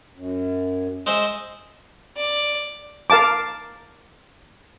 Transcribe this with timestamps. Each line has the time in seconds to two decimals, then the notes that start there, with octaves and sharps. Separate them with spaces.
0.15 F#2
1.06 G#3 C5 E5
2.16 D5
3.10 A#4 F5 A5 D6